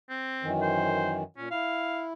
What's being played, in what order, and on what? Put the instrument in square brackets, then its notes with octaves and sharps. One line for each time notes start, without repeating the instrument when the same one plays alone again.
[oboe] C4
[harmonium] F#2 D#3 E3
[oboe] C5
[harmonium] A#2 [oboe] C#4
[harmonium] E4 [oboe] F5